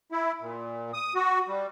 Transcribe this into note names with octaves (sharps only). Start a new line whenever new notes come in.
E4
A#2
D#6
F#4
G3